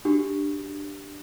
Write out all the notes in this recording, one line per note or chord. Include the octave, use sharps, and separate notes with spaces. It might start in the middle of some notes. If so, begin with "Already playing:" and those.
D4 F#4 G4 A4